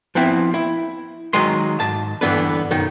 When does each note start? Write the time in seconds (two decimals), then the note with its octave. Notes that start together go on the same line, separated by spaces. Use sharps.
0.15 F3 B3 C4 E4
0.54 E4
1.33 D#3 F#3 G#3 D#5 C6
1.80 G#2 A5
2.21 G2 D3 E3 B3 B4
2.71 B1 F#2 D#3 D#4